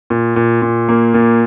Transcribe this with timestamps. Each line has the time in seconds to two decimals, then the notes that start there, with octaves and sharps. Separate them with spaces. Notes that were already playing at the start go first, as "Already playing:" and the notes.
0.10 A#2
0.36 A#2
0.62 A#2
0.89 A#3
1.14 A#2